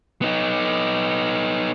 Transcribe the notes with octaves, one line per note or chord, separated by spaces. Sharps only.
B3 D#4